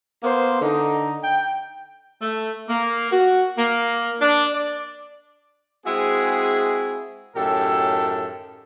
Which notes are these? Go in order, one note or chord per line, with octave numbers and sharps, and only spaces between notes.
A#3 B3 C5
D3 D#4
G5
A3
A#3
F#4
A#3
D4
D5
G#3 C4 E4 F#4 G#4
F#2 A2 D#3 G4 A4